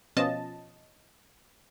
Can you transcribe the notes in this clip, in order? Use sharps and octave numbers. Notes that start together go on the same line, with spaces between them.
B2 F3 C#4 F4 D#5 A5